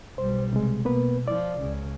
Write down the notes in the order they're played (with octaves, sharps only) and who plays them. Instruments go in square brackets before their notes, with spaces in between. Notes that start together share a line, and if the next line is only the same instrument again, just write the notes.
[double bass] B1 G3 [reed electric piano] C5
[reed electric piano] C3 G#3
[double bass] B2 [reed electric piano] A#3 B3 B4
[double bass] F3 [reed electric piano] D5
[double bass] C#2 C#3